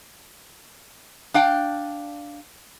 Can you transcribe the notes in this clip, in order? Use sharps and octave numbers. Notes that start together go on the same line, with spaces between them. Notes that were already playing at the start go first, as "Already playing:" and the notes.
D4 F5 G5